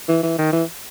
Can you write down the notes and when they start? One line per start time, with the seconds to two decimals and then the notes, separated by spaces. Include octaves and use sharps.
0.08 E3
0.23 E3
0.38 D#3
0.53 E3